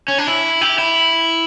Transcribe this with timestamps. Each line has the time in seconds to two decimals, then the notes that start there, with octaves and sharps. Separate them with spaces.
0.08 C#4
0.18 D4
0.27 E4
0.61 G4
0.78 E4